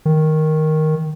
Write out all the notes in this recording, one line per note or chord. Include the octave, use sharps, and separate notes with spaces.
D#3